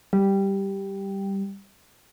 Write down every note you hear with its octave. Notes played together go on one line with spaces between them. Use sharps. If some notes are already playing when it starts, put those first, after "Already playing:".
G3